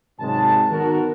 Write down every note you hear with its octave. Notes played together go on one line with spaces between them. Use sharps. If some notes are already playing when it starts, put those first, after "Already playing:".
G#1 C3 D#3 F#3 G#3 A5
D#3 B3 F#4 A#4